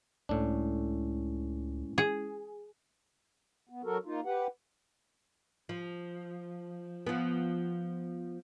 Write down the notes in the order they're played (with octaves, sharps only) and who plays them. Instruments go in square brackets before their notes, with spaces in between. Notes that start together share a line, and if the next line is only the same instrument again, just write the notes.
[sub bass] C#2 [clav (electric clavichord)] A2 D4 [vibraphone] G#3 C#4 E4
[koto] G#4
[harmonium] B3
F#3 F#4 A4 A#4
A#3 D#4 F4
G4 B4 F#5
[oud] F3
F3 B3